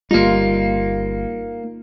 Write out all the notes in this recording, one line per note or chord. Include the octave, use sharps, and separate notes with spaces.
G1 G3 A#3 D#4 F4